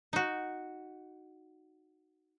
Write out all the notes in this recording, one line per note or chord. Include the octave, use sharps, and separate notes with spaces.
D#4 F#4